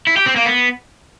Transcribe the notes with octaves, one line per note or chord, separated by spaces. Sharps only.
E4
G4
C4
A#3
B3